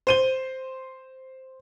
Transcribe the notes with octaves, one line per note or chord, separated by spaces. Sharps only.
C5 D#7 G7